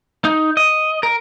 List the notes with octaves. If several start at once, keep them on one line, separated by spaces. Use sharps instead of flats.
D#4
D#5
A#4